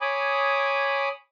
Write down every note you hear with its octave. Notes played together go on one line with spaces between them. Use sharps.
C#5 G#5 B5 D6 D#6